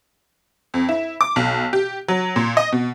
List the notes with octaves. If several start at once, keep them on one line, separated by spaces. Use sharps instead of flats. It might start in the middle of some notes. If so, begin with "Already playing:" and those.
F2
E4
D6
B1
G4
F#3
A#2
D#5
B2